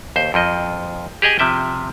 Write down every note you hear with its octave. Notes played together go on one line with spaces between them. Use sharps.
D#2 C5
F2 F3 D#5
G4 G#4 D#5 G#5
C3 F3 E5 G5